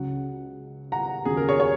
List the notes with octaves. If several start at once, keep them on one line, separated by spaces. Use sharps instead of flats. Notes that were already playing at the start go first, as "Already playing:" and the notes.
Already playing: C#2 C#3 F#3 F#5
F#5 A#5
D#2 C#3 F#3 G#4
A#4
G#4 C#5
G#4 C#5